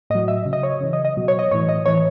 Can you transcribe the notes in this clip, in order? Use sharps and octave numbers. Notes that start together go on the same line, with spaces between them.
A2 F#3 D#5
E5
C#3 F#3
D#5
C#5
C#3 E3
D#5
D#5
B2 F#3
C#5
D#5
A2 E3 C#5
D#5
A2 E3 C#5